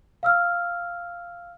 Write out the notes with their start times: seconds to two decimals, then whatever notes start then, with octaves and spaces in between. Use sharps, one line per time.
0.23 F5 E6 F6